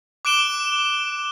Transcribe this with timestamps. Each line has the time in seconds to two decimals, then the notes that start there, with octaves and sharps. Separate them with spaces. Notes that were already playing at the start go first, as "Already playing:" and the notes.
0.25 D6 F#6 D7 E7 G7